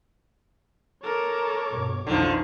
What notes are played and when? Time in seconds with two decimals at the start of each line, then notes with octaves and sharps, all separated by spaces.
1.03 A4 A#4 C#5 D6
1.72 G2 B2
2.07 B1 F2 D3 E3 F3 C#4 D#4